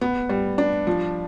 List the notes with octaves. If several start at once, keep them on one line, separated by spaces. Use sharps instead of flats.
B3
G3
D4
F3